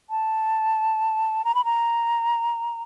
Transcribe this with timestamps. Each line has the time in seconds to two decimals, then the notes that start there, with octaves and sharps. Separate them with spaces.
0.10 A5
1.45 A#5
1.55 B5
1.65 A#5